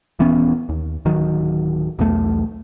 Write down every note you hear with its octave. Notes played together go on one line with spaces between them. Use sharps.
D#1 E3 B3 C#4
D#2
D1 D#3 F#3
B1 E2 A3